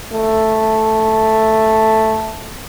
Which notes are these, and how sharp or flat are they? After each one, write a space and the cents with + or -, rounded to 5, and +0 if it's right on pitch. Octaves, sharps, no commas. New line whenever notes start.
A3 +0